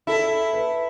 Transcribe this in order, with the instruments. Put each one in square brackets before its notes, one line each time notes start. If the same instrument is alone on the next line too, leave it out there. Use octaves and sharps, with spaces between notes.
[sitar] E4 [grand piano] A4
[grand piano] B4